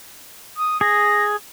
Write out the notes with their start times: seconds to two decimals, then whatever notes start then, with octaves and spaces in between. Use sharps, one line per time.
0.56 D#6
0.81 G#4 A#6